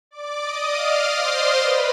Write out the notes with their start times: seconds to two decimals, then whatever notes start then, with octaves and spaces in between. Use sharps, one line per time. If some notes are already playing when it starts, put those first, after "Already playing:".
0.11 D5 D6
0.41 D#5 D#6
0.71 F5 F6
1.16 C5 C6
1.61 B4 B5